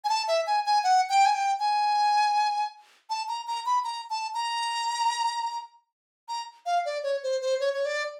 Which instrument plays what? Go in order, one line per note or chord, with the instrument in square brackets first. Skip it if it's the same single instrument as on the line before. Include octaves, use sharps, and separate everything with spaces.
[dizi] G#5
A5
E5
G#5
G#5
F#5
G5
G#5
G5
G#5
A5
A#5
A#5
B5
A#5
A5
A#5
A#5
F5
D5
C#5
C5
C5
C#5
C#5
D5